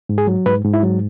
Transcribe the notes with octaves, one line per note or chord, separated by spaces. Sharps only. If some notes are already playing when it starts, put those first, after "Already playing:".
G#2
G#4
F#3
G#2 B4
G#2
E4
F#3